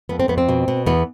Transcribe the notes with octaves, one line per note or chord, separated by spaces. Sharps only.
F2 B3
C4
F2 B3
C4
B2
B2
E2 B3